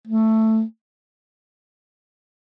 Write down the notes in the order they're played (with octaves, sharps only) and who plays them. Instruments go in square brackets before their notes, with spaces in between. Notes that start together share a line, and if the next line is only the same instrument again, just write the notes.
[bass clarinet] A3